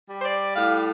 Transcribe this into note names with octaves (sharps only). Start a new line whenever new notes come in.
G3
C5
D5
A2 F5